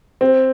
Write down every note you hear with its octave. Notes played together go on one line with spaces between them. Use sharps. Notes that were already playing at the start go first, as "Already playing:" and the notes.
C4